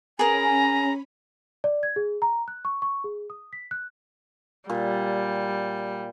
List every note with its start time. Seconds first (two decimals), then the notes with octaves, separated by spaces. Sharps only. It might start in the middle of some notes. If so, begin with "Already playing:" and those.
0.19 C#4 G#4 A#4 G#5 A#5 B5
1.64 D5
1.83 G#6
1.96 G#4
2.22 A#5
2.48 F#6
2.65 C#6
2.82 C#6
3.04 G#4
3.30 D#6
3.53 B6
3.71 F#6
4.70 A#2 G3